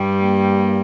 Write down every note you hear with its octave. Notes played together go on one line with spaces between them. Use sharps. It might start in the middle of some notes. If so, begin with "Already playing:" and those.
Already playing: G2 G3
A#3